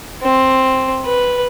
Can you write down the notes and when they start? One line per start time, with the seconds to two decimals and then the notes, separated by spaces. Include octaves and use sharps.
0.23 C4
1.05 B4